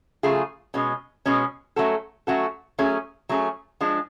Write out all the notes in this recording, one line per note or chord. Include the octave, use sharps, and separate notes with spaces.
C#3 F#3 A3 F4 G#4
B2 G#3 C#4
B2 G#3 C#4
F#3 A3 C#4 F#4 A4
F#3 A3 C#4 F#4 A4
F#3 A3 C#4 G#4
F#3 A3 C#4 G#4
F3 G#3 D4